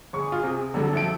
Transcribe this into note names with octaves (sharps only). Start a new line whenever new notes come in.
G1 G#4 C#6
F4
C3
D3 F#3 G3 A4
F2 E4 D7